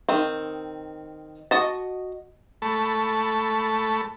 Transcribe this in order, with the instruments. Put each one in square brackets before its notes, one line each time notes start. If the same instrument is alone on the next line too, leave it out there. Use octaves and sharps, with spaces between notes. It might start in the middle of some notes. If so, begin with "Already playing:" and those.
[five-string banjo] D#3 C4
F#4 D#5 A5
[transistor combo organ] A3 A4 B5 C#6